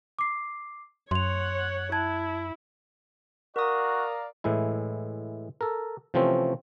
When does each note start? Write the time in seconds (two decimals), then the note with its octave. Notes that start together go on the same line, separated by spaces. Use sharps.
0.19 D6 C7
1.11 F#2 C#5 F#5 C6 F7
1.92 E4 A5 G#6
3.56 F#4 A#4 D5 F5 A#5 D#6
4.44 A2 E3 G#3 E4
5.61 A4 A#4
6.14 C3 E3 F3 A3 C4 C#4